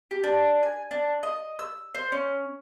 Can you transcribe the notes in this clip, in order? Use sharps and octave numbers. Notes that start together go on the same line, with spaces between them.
G4
D4
G#5
D4
D#5
E6
C5
C#4